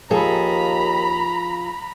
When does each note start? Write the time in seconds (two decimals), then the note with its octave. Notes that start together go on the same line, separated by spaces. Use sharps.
0.11 D#2 F3 G#4 A4 A#5 B5